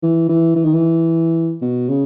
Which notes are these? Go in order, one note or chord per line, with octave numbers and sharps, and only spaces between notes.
E3
E3
E3
D#3
E3
B2
C#3